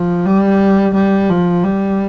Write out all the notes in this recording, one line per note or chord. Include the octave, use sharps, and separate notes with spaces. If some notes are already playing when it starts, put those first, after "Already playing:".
Already playing: F3
G3
G3
F3
G3